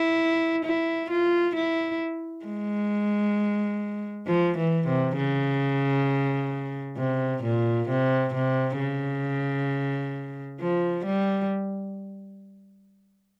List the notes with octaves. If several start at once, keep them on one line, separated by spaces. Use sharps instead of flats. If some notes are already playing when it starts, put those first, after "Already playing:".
Already playing: E4
E4
F4
E4
G#3
F3
E3
C3
C#3
C3
A#2
C3
C3
C#3
F3
G3